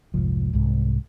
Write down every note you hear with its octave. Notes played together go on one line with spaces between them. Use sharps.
F1 C2 G#2 F3
C2 G#2 G#3